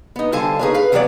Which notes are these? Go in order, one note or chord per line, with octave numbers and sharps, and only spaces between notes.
B3 D#4
D3 G3 A4 C5 F5 G#5
D#4 G#4 A#4 B4 C#5 F5
B4 F5
E2 C3 F#3 B3 C#5 D5